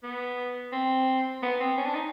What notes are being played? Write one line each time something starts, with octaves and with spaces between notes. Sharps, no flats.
B3
C4
B3
C4
C#4
D4
D#4